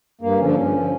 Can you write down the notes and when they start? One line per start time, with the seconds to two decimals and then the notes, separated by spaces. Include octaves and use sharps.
0.21 G2 A#3
0.38 D3 F3 C#4
0.47 D4
0.53 G2 C#4
0.73 D3 F3